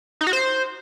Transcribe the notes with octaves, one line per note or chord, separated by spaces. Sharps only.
D#4
F#4
C5